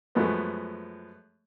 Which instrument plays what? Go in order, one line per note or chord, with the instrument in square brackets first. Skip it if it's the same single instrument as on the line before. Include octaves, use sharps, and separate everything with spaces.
[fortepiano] F#2 F3 G#3 A3 B3